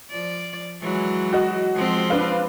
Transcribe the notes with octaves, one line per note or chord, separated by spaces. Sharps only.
F3 D5
E3 F#3 G#3
F#4 D#5
F3 G#3 C4
D4 B4 F5